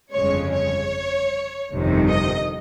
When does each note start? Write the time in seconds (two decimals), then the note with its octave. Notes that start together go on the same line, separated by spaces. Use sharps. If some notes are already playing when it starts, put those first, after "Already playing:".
0.13 G1 F2 C#3 G#3 C#5
0.53 C#5
1.72 G1 F2 C3 D#3
2.12 D#5